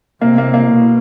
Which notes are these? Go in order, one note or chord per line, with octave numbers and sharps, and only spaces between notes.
C3 A#3
A#3
A#3
B2